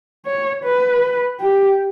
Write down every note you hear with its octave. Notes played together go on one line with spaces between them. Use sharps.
C#5
B4
G4